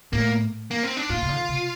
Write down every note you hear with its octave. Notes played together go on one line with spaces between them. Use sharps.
A2 A#3
A#3
C4
D4
A#2 F4
C3
D3
C3